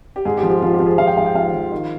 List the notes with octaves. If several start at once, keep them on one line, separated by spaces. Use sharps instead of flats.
G4
G#2 G#4
G4
F3
G4
F3 F4
G4
F3
G#4
F3 F5
G5
G#2 F5
G5
F3 F5
F3
D#3